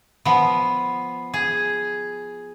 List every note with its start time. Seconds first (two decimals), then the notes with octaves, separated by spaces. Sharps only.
0.25 F3 B3
1.34 G#4